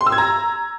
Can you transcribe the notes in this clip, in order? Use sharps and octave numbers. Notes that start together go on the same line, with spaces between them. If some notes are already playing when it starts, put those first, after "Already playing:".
C6
E6
G#6
A#5